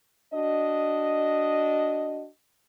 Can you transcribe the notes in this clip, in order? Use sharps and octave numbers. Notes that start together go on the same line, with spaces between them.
D4 F#4 D#5